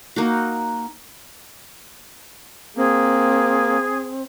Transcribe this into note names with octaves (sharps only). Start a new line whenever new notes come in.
A#3 D#4 F#4
A#3 C4 G#4